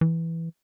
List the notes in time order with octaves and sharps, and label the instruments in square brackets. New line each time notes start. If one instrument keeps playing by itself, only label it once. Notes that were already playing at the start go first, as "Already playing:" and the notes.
[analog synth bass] E3